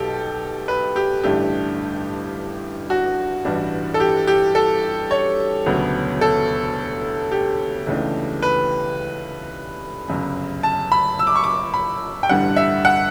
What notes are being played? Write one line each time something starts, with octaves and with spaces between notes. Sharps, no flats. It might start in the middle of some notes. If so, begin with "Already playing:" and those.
Already playing: B1 B2 G4 A4
B4
G4
A1 G2 D3 A3 D4 G4
F#4
A1 G2 E3 G3 D4
A4
G4
G4
A4
C#5
E1 D2 C#3 F#3 B3
A4
G4
C#2 C#3 E3 A3 D4
B4
G1 F#2 C#3
A5
B5
E6
D6
C#6
D6
B5
G5
A1 G2 D3 G3 F#5
E5
F#5